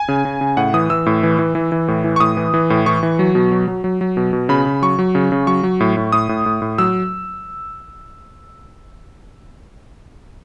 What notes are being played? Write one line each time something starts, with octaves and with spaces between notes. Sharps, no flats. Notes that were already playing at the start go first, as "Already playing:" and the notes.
Already playing: G#5
C#3
C#3
C#3
A2 F#5
E3 D#6
E3 E6
A2
E3
E3
E3
E3
A2
E3
C#6
A2 D#6
E3
E3
A2
E3 C#6
E3
F#3
B2
F#3
F#3
F#3
F#3
B2
B2
C#3 B5
C#3
F#3 C#6
F#3
C#3
C#3
F#3 C#6
F#3
A2
A2
A2 D#6
A2
A2
A2
F#3 E6